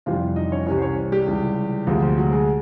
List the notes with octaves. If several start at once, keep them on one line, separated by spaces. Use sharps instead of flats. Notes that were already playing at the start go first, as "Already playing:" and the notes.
F2 C3 E3 G3 F4 F5
D#4 D#5
C#4 C#5
C2 C3 E3 C#4 C#5
C5
C#4 C#5
G3 G4
C#2 C3 E3 G3
D2 C3 F3 G#3 F4
F3 F4
F#3 F#4
G#3 G#4